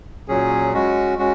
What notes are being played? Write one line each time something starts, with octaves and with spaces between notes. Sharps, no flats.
A#2 F#3 C#4 G#4
G#3 C#4 F#4
G#3 C#4 F#4